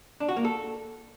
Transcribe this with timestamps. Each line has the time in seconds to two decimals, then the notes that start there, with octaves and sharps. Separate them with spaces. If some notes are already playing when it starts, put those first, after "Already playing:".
0.20 D4
0.29 F#4
0.37 A#3
0.45 A4